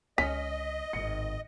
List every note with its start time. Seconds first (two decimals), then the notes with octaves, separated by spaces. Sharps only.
0.18 C#2 D3 C#4 D#5 B6
0.93 G#1 A2 C#7